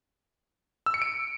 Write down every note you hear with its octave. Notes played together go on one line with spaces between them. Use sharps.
E6
C#7
D7